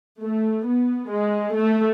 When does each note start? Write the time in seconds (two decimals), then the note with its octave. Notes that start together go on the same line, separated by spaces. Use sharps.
0.22 A3
0.66 B3
1.11 G#3
1.55 A3